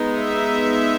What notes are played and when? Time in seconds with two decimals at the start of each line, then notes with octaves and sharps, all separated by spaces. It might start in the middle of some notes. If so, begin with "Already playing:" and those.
Already playing: G#3 B3 D#4
0.17 E5